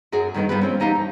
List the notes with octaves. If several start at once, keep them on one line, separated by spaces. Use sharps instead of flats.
F#2 F#3 F#4 G#4
G2 D#3 B3 A#4
G3 B3 F4 G4 B4
F3 C4 C#4
E2 D#4 G4 F5 A5
G2